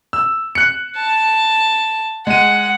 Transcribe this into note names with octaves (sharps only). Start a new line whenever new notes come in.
E6
F#6 C#7
A5
G#3 F#5 D#7